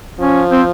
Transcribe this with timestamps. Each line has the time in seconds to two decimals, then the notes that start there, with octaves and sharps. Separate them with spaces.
0.19 F3 C#4
0.51 C4